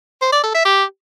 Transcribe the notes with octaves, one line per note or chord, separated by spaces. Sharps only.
C5
D5
A4
E5
G4